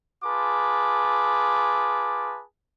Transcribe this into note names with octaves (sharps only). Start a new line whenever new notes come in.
F4 G#4 B4 A5 D6